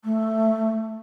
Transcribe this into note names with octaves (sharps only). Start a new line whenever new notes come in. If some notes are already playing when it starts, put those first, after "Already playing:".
A3